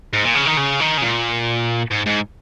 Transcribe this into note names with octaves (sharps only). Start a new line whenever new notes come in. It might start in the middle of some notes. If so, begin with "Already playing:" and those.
G#2
A#2
C#3
D#3
C#3
D#3
C#3
A#2
G#2
G#2